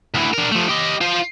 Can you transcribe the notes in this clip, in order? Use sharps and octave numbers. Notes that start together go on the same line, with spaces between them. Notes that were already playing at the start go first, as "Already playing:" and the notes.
D2 E3
D4 A#4
F3 A3
G4 D#5
F4 C5